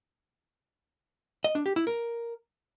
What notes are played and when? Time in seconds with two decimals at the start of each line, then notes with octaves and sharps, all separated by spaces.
1.44 D#5
1.55 D4
1.66 G4
1.76 E4
1.87 A#4